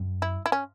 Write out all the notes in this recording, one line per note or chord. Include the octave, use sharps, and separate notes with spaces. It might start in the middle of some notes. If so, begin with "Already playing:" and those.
Already playing: F#2
E4
E4
C#4